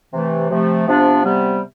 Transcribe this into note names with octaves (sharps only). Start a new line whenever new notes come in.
C3 E3 A3
C3 F3 A3
C3 F3 B3 D4
C3 G3 B3